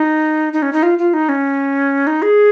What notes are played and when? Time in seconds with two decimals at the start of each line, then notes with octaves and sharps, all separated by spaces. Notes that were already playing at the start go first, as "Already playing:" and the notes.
Already playing: D#4
0.53 D#4
0.62 C#4
0.73 D#4
0.83 F4
0.98 F4
1.14 D#4
1.29 C#4
2.07 D#4
2.22 G#4